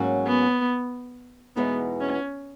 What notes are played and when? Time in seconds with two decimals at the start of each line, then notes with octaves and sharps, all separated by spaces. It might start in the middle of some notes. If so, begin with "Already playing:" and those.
Already playing: G#2 F#3 A#3 C#4 F#4
0.27 B3
1.56 E2 B2 G#3 B3 D#4
2.01 C#4